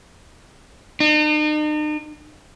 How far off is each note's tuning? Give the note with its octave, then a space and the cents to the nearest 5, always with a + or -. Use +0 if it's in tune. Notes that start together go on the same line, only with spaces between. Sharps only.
D#4 -45